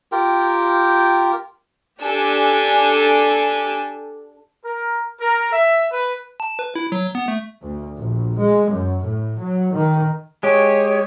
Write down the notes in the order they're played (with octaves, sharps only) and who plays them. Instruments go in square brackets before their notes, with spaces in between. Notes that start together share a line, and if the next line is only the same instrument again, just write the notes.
[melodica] F4 G4 A#4 G5
[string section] D4 G4 A4 G#5
[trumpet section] A#4
A#4
E5
B4
[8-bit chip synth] A5
B4
E4
F#3
B3
A3
[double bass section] D2
A#1
G#3
F#2
A2
F#3
D#3
[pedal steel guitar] G#3 G4 [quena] C#5